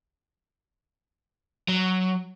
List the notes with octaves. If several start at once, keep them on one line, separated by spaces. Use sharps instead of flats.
F#3